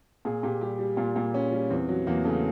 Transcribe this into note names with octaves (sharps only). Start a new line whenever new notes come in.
A#2 G#4
A#2 G4
G3 G4
G3
A#2 F4
A#2
G3 C#4
G3
E2 C4
F#3
E2 A#3
C#3 A3